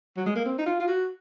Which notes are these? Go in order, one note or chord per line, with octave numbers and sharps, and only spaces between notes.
F#3
G#3
A#3
C4
D#4
F4
F4
F#4